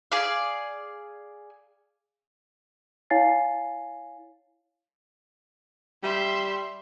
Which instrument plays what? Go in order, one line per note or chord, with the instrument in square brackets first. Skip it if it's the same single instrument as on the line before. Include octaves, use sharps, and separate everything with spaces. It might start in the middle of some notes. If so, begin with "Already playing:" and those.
[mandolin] G#4 D5 F5
[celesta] E4 C#5 F5 G#5 A6 C7
[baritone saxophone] G3 [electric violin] E5 C6